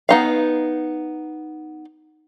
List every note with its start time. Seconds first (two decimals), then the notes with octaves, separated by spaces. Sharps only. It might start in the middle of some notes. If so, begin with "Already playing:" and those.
0.09 B3 D#4 F5